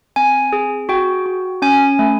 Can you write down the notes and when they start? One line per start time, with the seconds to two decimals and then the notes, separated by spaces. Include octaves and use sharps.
0.16 C4 G#5
0.53 G#4
0.89 F#4 G5
1.26 F#4
1.62 C#4 G#5
1.99 A3